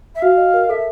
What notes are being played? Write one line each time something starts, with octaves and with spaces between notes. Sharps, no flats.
E5
F#4 F5
D#5
A#4
A4 E5